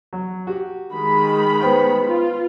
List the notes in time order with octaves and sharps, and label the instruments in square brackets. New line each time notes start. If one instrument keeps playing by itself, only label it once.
[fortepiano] F#3
F#4 G4
[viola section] D#3 G#3 B5
[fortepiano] B3 C5 G5
[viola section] F4